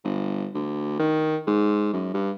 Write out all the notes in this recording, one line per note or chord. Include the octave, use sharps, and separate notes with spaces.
G1
D2
D#3
G#2
F#2
G2